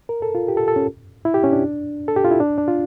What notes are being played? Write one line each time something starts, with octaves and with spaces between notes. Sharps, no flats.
A#4
A4
F4
G4
A4
A4
C#4
E4
G4
C#4
D4
A4
G4
F4
E4
D4
D4
F4